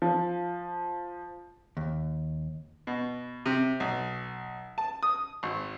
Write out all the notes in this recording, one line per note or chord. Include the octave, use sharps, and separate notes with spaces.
F3
D#2
B2
C3
B1
A5
D#6
G#1